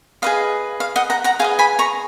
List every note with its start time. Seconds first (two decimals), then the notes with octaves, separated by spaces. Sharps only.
0.22 G#4 B4 D#5 F5
0.80 F5
0.96 D#5 F#5
1.10 F#5 A#5
1.24 F#5 A#5
1.39 G#4 B4 D#5 F5 G#5
1.59 G#5 B5
1.79 A#5 C#6